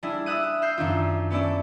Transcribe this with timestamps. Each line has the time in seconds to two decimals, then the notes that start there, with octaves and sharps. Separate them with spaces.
0.03 G3 D4 E4 G#4
0.26 E4 E5 D#6 F#6 D#7
0.62 E5 F6 G6 C7
0.78 F#2 D#3 D4 F4
1.31 B3 C#4 E4 D5 A5